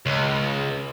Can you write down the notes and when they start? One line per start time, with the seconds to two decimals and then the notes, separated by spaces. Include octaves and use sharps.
0.06 C#2